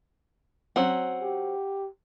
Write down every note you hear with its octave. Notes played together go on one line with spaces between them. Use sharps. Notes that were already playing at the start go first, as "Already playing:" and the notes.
F#3 C4 C#4 F#5
G4